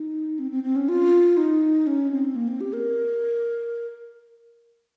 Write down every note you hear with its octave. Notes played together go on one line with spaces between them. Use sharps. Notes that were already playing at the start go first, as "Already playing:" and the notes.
Already playing: D#4
C4
C4
C4
C#4
F4
D#4
C#4
C4
A#3
C4
G4
A#4